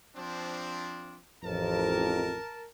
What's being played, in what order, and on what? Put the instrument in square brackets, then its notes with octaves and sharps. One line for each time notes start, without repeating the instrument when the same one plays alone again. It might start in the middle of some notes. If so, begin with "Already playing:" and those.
[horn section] F3 C4 D4
[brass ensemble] A1 F2 [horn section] A#4 A5